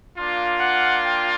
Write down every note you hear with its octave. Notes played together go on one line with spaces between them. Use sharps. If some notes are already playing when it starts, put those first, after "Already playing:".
A#3 D4 F4
F#5
G5